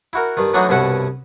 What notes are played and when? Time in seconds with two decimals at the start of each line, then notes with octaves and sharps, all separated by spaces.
0.13 E4 F#4 A#4
0.37 G2 D#3
0.54 E3 F#3 A3 D4 D#4 F#4
0.69 C2 G2 B2 C#4 E5 F#5